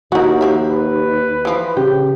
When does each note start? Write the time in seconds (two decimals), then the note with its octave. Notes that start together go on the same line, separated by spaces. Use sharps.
0.12 D#2 D#4 E4 F#4 A#4
0.41 F3 G4 E5
0.71 B4
1.45 E3 F3
1.77 C#3 G4